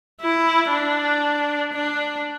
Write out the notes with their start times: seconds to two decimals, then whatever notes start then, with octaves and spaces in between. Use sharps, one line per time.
0.21 E4
0.71 D4
1.73 D4